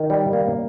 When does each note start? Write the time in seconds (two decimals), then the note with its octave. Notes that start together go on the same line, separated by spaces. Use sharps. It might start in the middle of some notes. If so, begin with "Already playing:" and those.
Already playing: D#3
0.10 G3
0.33 A#3